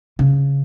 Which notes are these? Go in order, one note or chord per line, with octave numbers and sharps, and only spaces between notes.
C#3